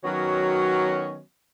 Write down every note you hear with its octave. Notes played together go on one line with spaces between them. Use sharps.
D#3 F#3 B3 C#4 F#4 C#5